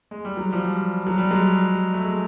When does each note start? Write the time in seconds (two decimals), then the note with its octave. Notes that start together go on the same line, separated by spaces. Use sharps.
0.11 G#3
0.25 G3
0.37 F#3
0.52 F3 G3
1.07 F#3
1.18 G3
1.30 F#3 G#3
1.93 A3
2.05 G#3